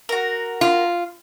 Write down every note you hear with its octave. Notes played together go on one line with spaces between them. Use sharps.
F#4 A#4
F4